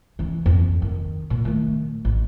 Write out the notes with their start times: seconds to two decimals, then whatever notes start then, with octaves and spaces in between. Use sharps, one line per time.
0.19 E3 C#4
0.46 F2
0.82 D#3
1.30 A#2
1.45 D#3 A3
2.05 A1